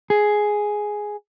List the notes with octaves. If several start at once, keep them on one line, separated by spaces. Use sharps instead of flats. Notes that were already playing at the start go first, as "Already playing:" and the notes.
G#4